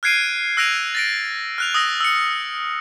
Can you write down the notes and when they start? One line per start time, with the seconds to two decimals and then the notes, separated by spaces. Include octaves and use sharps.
0.03 F6 F#6 G#6 C7 D7 D#7
0.57 E6 F#6 A#6 D7 D#7 F7
0.95 A6 A#6 D7
1.58 F6 F#6 F7
1.74 D#6 E6 A#6
2.01 E6 C#7